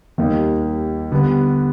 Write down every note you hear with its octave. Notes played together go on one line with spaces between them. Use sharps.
D#2 D#3 G3 A#3 D#4
D3 G3 B3